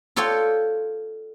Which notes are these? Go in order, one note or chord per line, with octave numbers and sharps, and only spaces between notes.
F4 A4 C#5 D5 G5